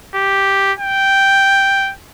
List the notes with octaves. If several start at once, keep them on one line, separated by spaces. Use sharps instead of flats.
G4
G5